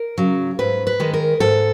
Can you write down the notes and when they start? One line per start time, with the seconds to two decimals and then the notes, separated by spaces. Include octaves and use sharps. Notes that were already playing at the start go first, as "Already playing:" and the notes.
Already playing: A#4
0.18 C#3 F#3
0.59 G#2 B4
0.87 B4
1.00 D#3 G#3
1.14 A#4
1.40 G#2 A4